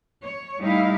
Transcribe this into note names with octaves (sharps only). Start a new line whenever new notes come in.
C#5
G3 A3 D#4 E4 F5